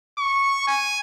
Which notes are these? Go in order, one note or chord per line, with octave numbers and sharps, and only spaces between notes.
C#6
G#5